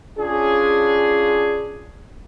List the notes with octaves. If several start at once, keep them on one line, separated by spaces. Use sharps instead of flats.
C#4 D4 F4 G#4